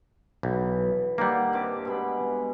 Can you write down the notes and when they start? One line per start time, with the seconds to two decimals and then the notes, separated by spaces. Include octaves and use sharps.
0.43 B1 E3
1.18 D#3 G3 A#3 D#4 F#5
1.53 G2 C3 D6
1.85 B2 G#3 B5